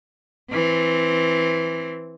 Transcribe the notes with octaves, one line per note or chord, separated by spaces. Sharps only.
E3 C4